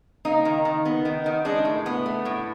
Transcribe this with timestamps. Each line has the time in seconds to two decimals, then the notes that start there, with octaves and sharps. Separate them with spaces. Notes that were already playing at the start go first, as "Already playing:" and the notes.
0.25 A#3 D#4
0.45 D#3
0.65 D#3
0.85 B3
1.05 D#3
1.26 D#3
1.45 G#3 D4
1.65 A2
1.86 B3
2.06 A3
2.25 A2